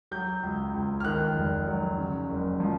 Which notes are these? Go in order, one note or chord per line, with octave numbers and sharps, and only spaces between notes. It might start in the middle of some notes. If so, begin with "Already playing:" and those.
F#3 G6
C#2
C#2
F6
D#3 F#6
F1
F#3
C#3
F#1
F3